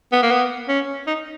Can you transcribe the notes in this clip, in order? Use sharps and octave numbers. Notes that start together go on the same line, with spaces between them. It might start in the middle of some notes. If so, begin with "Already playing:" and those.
B3
A#3
B3
C#4
D#4